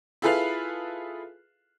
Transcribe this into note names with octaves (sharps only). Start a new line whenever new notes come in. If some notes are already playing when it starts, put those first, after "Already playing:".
E4 F4 G#4 A4 B4 F5